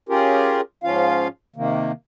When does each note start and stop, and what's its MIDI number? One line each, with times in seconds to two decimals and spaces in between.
0.09 0.61 61
0.09 0.61 65
0.09 0.61 67
0.09 0.61 68
0.09 0.61 70
0.84 1.28 44
0.84 1.28 53
0.84 1.28 61
0.84 1.28 65
0.84 1.28 77
1.56 1.92 48
1.56 1.92 51
1.56 1.92 58